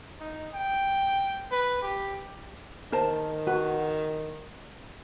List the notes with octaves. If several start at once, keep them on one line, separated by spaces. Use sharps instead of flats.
D#4
G5
B4
G4
D#3 A#4 C5 A5
F#4 B4